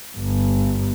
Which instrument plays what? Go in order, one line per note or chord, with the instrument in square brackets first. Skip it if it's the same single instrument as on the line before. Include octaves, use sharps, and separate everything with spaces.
[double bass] G1